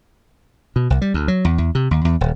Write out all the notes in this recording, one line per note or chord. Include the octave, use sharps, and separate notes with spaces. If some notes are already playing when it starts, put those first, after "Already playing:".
B2
C2
G3
D2
F#3
E2
E2
C3
D#2
E2
D#1